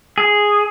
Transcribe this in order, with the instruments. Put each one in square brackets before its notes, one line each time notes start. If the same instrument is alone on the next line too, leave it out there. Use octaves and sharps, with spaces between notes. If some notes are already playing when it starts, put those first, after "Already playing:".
[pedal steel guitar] G#4